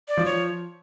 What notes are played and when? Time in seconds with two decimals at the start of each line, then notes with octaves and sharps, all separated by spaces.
0.08 D5
0.17 F3
0.26 C#5